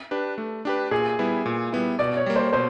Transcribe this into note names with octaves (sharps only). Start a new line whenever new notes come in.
D4 G4 B4
A3
D4 G4 B4
A#2 G#4
G3 B3 E4
A#2
G3 B3 E4
B2 D5
C#5
G3 A#3
C5
B2 C5